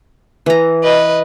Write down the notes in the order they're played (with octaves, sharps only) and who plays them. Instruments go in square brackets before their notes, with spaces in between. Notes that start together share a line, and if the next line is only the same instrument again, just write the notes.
[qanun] E3 A#5
[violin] B4 D#5